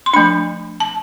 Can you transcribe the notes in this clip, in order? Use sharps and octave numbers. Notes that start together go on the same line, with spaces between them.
C6
F3 A3 D4 B5
A5